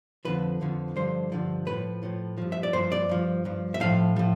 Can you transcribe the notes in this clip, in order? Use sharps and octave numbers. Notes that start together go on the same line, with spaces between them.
F2 D3 F3 B4
F2 D3 F3
G2 D3 F3 C5
G2 D3 F3
A2 F3 B4
A2 F3
G2 F3
E5
D5
G2 F3 C5
D5
G2 F3
G2 F3
E5
A2 F3 F5
A2 F3